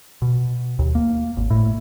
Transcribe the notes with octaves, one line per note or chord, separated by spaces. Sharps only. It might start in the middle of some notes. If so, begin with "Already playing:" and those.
B2
D#2
A#3
G#1
A2